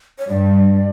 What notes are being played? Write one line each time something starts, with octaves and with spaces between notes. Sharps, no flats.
C#5
G2 D5